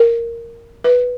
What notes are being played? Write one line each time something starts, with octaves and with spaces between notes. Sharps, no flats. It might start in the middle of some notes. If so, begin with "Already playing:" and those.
Already playing: A#4
B4